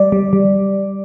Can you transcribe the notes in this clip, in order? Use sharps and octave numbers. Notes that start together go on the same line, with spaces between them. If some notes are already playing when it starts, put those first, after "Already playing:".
Already playing: G3 D5
G3
G3